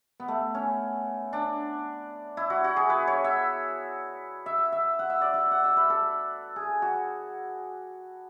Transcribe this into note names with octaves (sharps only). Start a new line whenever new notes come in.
B3
A3
C#4
D4
E4
F#4
F#4
G#4
B4
C#5
E5
E5
E5
F#5
E5
D5
E5
F#5
E5
B4
A4
G#4
F#4